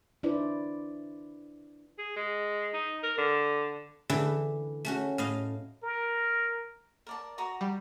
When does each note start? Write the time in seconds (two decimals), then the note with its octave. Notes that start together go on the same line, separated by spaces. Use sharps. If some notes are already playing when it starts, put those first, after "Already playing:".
0.23 D4 E4 B4 C5 D5
1.98 G#4
2.16 G#3
2.74 D#4
3.03 A#4
3.18 D3
4.10 D3 E3 A3 E4 A4
4.85 A3 C#4 F#4
5.18 A2 D#5 F5
5.83 A#4
7.07 A#4 D5 A5
7.38 F#4 A#5 D#6
7.61 G3